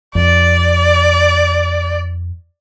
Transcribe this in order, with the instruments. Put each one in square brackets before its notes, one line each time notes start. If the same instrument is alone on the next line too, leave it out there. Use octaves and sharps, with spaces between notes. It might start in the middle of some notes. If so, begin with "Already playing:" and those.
[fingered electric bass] F2 [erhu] D5